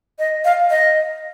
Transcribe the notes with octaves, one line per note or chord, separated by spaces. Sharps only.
D#5
F5
D#5